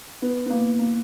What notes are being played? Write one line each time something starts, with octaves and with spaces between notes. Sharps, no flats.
B3
B3
A#3
A#3